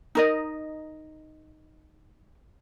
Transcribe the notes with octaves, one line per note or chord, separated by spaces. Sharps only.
D#4 A#4 D#5